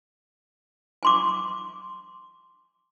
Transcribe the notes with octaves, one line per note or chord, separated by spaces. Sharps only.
G#5 C6 D6